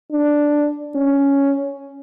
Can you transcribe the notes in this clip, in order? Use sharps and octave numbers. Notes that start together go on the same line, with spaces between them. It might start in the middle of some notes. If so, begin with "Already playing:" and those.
D4
C#4